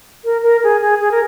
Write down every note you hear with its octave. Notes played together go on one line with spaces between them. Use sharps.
A#4
A#4
G#4
G#4
G#4
A#4